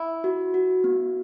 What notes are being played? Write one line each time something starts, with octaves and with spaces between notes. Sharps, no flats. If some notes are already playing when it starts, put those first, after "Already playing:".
Already playing: E4
F#4
F#4
B3